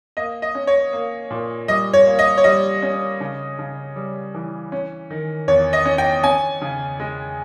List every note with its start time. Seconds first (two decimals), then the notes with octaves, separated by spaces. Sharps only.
0.17 A#3 D#5
0.42 D#5
0.55 C#4
0.67 C#5
0.93 A#3
1.30 A#2
1.68 G3 D#5
1.93 C#5
2.07 A#3
2.19 D#5
2.37 C#5
2.44 G3 D#5
2.82 C#4
3.21 C#3
3.59 C#3
3.96 G3
4.34 E3
4.72 C#4
5.11 D#3
5.48 E2 C#5
5.73 D#5
5.85 C#4
5.98 G5
6.24 C#4 G#5
6.62 C#3
7.00 G#3